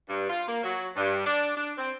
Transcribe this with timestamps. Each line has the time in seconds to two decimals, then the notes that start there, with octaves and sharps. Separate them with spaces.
0.08 G2
0.28 F4
0.47 A#3
0.63 F#3
0.96 G2
1.24 D4
1.55 D4
1.76 C4